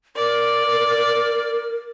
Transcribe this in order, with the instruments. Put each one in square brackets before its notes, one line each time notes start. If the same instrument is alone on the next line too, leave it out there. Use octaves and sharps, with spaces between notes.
[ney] A#4 [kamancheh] D5